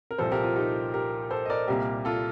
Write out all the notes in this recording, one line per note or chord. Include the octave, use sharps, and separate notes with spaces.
A#4
C2 A#2 F3 A4 C5
G4 A#4
F4 A4
D#4 G4
G4 A#4
A4 C5
D#5
A#4 D5
C2 A#2 G3 A#3 G4 A#4
F4 A4